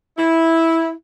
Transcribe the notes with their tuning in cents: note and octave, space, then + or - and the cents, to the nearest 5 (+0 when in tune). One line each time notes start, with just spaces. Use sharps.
E4 -10